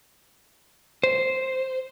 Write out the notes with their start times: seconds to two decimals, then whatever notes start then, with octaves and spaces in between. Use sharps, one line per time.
1.03 C5